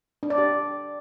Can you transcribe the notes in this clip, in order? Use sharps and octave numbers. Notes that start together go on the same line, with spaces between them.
D4
D5
G4